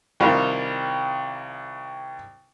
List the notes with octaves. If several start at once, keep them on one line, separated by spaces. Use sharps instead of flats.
C2 D#3 G3 F4